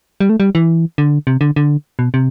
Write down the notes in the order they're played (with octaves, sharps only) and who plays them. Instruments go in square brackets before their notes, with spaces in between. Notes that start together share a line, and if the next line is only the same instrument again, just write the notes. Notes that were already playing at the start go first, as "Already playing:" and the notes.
[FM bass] G3
A3
G3
E3
D3
C3
D3
D3
B2
C3